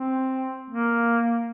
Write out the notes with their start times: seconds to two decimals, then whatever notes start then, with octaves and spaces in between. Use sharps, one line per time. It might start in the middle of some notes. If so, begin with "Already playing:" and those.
Already playing: C4
0.70 A#3